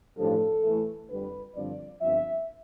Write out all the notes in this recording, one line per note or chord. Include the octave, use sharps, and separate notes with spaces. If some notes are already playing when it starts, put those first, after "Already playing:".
A1 G2 F3 A4
A2 E3 A3
F2 D3 G3 B4
G2 D3 F3 C4 D5
G1 G2 F3 C4 E5